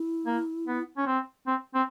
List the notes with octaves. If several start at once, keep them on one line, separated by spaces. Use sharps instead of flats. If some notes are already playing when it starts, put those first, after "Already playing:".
Already playing: E4
A#3
B3
C#4
C4
C4
C4